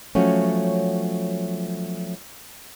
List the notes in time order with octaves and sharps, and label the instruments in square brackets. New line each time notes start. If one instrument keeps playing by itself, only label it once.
[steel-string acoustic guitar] F3 F#3 A3 C#4